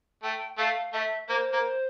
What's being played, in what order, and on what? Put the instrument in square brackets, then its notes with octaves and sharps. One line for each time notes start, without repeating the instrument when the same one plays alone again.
[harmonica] A3 [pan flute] G5
[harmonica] A3 [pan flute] F5
[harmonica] A3 [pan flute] E5
[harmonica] A#3 [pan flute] C5
[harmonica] A#3